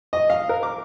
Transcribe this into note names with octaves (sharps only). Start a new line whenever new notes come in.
D#5
F5
A#4
D6